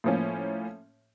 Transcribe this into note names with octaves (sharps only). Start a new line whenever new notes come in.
A2 F3 A#3 C#4